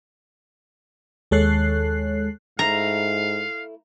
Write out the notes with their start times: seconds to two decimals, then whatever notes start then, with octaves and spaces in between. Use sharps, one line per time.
1.31 D#2 G#3 A4 C#5 F#6 C7
2.59 G#2 A3 E4 F5 A#5